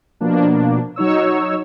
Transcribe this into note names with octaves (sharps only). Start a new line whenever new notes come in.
B2 F3 A#3 D4
F#3 D#4 C#5 E6